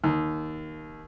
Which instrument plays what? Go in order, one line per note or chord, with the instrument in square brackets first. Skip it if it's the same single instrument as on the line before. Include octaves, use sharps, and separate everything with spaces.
[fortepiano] D#2